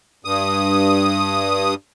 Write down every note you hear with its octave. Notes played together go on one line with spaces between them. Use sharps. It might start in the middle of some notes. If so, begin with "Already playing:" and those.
G2 D#6